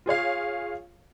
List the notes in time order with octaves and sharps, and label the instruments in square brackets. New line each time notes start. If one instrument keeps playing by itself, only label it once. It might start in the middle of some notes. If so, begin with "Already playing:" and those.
[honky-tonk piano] F4 G#4 C#5 F5